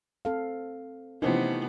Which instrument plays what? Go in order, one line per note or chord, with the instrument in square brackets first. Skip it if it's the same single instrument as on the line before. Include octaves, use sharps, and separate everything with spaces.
[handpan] C4 A4 F5
[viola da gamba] C3 A3 B3 [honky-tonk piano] E3 F3 C#4 [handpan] D#4 C5